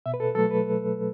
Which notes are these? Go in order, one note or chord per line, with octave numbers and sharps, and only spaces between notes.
B2 E5
B4
A4
F#3 A3 A4
B4